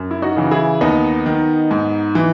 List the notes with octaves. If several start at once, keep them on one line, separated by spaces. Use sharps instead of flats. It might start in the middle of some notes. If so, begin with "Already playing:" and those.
Already playing: F#2
E4
D#4 F#4
C#3 E3
E4 G#4
D#2 B3 D#4
D#3
G#2
E3